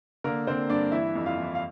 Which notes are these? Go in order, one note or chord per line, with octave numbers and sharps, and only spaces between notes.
D3 A#3 A#4
D3 C4 C5
G2 D4 D5
E3 E4 E5
F2
F4 F5
E3
F5